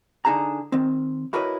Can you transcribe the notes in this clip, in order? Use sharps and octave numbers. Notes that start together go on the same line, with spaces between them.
D3 D#4 G#4 A5 A#5
D#3 C4
E4 F#4 A#4 B4 C#5 D#5